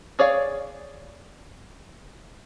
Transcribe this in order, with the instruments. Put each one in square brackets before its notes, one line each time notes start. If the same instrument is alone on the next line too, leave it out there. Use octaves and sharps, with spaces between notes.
[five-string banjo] G#4 C#5 D5 F5